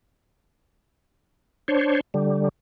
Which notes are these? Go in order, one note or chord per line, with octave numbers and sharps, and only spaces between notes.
D4 C5 C#5
D3 G3